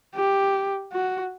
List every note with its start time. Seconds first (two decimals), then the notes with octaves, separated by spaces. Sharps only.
0.15 G4
0.93 F#4